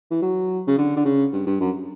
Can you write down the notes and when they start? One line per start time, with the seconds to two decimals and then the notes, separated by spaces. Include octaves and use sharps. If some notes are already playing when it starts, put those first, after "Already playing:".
0.11 E3
0.22 F#3
0.67 C#3
0.78 D3
0.97 D3
1.05 C#3
1.33 G2
1.47 G2
1.60 F#2